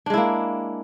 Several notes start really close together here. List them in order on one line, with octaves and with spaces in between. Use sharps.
D4 G#3 E4 A#3